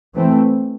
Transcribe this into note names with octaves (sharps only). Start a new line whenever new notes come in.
E3 A3 C4